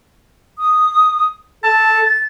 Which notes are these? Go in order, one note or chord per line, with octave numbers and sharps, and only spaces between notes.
D#6
A4 A5
A6